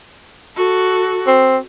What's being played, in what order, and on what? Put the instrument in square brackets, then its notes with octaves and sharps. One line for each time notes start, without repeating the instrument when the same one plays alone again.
[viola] F#4 A4
[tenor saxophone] C4